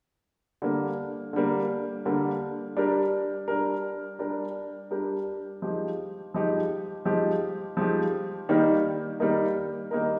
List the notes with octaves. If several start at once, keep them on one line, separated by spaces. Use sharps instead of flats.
D3 G3 A#3
D3 G3 A#3
D3 G3 A#3
G3 D4 G4 A#4
G3 D4 G4 A#4
G3 D4 G4 A#4
G3 D4 G4 A#4
F3 G#3 D#4 G4
F3 G#3 D#4 G4
F3 G#3 D#4 G4
F3 G#3 D#4 G4
D#3 G3 A#3 D#4 A#4
D#3 G3 A#3 D#4 A#4
D#3 G3 A#3 D#4 A#4